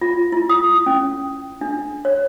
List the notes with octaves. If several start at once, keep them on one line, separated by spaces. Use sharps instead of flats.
F4
E4
D#6
C#4
D4
C#5